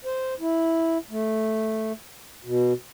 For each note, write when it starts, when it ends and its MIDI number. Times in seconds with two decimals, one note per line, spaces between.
0.05 0.34 72
0.40 0.98 64
1.11 1.92 57
2.45 2.73 47